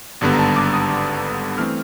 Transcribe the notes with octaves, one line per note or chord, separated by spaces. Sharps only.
G#1 G2 D3 G3 B3
A#5
A5
D6
D#6
E3 A3 C4 F6